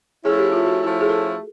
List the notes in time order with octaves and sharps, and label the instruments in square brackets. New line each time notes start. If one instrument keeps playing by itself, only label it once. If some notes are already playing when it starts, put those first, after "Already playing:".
[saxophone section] F3 A3 C#4 E4 [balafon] G#4
[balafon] G4
F4
F#4
[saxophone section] F3 A3 C#4 E4
[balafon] G#4
A4